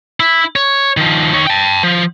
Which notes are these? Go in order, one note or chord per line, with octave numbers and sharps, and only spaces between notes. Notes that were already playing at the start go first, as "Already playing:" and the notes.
E4
C#5
D#3 F3
D#3 C#5
G5 A5
F3